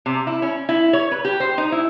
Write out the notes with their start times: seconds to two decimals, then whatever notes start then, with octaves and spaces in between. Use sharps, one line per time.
0.06 C3
0.27 E4
0.42 C#4
0.69 E4
0.93 C#5
1.11 B4
1.25 G4
1.40 C5
1.58 D#4
1.72 E4